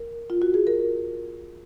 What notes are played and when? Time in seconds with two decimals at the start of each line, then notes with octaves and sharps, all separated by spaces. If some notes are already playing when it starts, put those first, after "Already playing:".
Already playing: A#4
0.30 F4
0.42 F#4
0.54 G#4
0.67 A#4